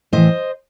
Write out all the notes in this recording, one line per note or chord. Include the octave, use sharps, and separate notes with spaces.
A2 E3 C5 D#5